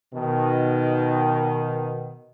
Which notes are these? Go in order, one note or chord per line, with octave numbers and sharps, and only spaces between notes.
B2 D#3